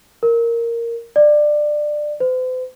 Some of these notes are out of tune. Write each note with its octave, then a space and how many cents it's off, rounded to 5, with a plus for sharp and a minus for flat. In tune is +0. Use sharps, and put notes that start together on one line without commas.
A#4 -5
D5 +20
C5 -45